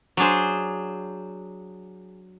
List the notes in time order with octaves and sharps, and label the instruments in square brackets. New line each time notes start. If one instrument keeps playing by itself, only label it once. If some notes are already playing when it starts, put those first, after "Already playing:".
[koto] F#3 D4 G#4 C5